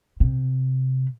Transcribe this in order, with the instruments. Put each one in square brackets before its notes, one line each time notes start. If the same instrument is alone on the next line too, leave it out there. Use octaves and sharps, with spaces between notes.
[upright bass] C3